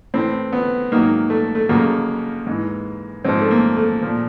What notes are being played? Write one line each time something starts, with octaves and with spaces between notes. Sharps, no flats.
A2 E3 C4
B3
G#2 D#3 F#3 A#3
A3
A3
F2 C#3 F#3 A#3
G#2 E3
G#2 F3 C4
A3
A#3
A3
A#2 F3